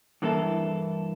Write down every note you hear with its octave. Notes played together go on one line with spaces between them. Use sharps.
G2 E3 A#3 E4 A4